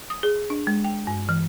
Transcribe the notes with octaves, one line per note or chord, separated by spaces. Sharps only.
D#6
G#4
D4
G#3
G5
G2
E3